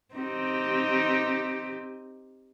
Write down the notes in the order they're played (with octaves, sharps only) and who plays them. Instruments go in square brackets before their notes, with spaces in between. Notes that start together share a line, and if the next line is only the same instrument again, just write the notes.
[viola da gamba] C4 D#4 G4